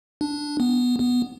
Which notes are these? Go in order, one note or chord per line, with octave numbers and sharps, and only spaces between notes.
D4
B3
B3